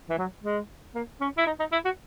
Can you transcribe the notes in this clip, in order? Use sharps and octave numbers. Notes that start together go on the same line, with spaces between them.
E3
F#3
G#3
A#3
C#4
E4
D#4
D#4
E4
F#4